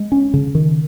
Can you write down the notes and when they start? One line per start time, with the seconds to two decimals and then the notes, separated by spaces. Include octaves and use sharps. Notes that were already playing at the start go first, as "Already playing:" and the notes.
Already playing: G#3
0.12 C#4
0.34 C#3
0.55 D#3